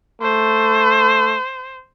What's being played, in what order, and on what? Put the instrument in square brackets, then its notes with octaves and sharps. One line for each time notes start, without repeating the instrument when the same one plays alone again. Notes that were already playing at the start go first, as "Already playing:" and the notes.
[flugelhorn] A3 [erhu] C5